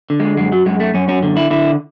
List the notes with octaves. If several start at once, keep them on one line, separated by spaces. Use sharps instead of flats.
D3
G#3
F#2 G#3
F#3
F#2 G#3
A3
F#2 C#4
C#4
D3
E4
D3 E4